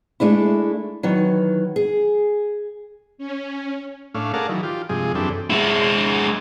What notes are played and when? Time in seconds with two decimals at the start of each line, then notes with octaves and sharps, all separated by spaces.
0.20 G#3 A3 D4 E4
1.03 D#3 E3 F#3
1.76 G#4
3.18 C#4
4.15 A2 A3 C#4 D4 F5
4.34 G#4 A#4 D5 F5 F#5 A5
4.49 D#3 E3 F#3
4.63 F4 G4
4.89 G2 C3 F3 G#3 G#4
5.15 F#2 E3 C4 D4 G4 A4
5.50 G#3 E4